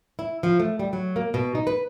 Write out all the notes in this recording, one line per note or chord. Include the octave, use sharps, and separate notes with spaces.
E4
F3
A3
G3
F#3
A#3
B2
D#4
B4